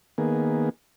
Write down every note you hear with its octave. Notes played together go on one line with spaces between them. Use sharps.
D#3 A#3 B3 G#4